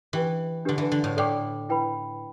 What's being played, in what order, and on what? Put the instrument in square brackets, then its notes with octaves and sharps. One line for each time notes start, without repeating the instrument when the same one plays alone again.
[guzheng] E3 [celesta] G4 B4 G5
[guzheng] D3 [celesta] D4 G4 B4
[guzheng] E3
D3
A2
[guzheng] A2 [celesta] A4 D5 G5 D6
[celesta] E4 B4 G5 B5